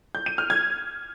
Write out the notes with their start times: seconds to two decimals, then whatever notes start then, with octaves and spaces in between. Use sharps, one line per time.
0.15 G6
0.26 D#7
0.38 F6
0.50 G#6